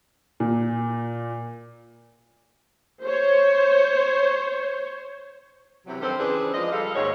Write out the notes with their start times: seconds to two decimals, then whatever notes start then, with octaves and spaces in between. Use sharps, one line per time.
0.40 A#2
3.03 C5 C#5
5.87 C3 E3 F#3
6.01 G2 D#3 C4 G4 A4 C5
6.18 C#3 E3 C4 D4 G#4 B4
6.54 F3 G#3 A#4 D5 D#5
6.72 G3 A4 F5
6.95 D#2 G#2 C#5